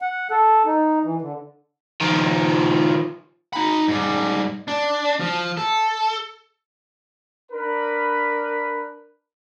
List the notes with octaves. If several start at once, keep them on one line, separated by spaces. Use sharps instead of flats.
F#5
A4
D#4
E3
D3
D#3 F3
D#4 B5
G#2 G3
D4
F3
A4
D4 A#4 B4 B5